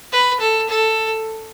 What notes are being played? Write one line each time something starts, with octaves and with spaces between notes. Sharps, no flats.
B4
A4
A4